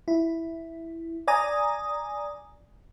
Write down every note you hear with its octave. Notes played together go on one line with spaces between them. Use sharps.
E4
D5 G#5 A#5 D#6